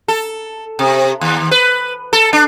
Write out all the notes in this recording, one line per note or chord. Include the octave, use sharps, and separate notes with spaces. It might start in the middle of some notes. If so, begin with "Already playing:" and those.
A4
C3
D#2
B4
A4
D4